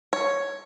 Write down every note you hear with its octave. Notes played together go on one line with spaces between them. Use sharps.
C#5